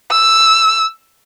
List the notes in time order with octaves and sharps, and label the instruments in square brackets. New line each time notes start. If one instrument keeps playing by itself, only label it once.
[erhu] E6